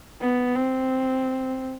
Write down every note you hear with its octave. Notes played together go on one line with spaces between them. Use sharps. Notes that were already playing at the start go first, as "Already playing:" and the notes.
B3
C4